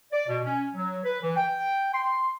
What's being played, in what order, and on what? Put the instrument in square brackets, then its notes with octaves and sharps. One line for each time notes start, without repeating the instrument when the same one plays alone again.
[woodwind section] D5
B2
C#4
F#3
B4
E3
G5
C6